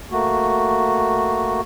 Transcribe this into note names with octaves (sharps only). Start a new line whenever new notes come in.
A3 A#3 F#4